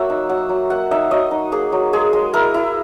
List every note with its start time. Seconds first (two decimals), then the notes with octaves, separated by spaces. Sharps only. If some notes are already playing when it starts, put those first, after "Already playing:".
Already playing: F#3 A#3 C#5 E5 F#5
0.10 D#4
0.29 F#3 F#5
0.49 F#3
0.70 A#3 F#5
0.91 D#4 E5
1.11 F#3 D#5
1.31 D#4
1.52 A#3 G#4
1.72 F#3
1.93 G#3 G#4
2.13 G#3
2.34 E4 A#4
2.54 E4